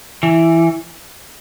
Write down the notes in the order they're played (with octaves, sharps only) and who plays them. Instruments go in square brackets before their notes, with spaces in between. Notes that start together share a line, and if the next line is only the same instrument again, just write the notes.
[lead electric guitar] E3